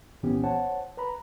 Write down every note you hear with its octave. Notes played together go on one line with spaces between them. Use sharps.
C2 A#2 E3 B3 C#4 G4
C5 C#5 F#5 A5
B4 A#5 B5